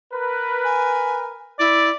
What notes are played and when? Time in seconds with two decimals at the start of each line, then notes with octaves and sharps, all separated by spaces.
0.13 A#4 B4
0.64 G#5
1.59 E4 D5